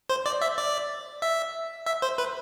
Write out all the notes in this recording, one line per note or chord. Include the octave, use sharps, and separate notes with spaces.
C5
D5
E5
D5
E5
E5
C5
B4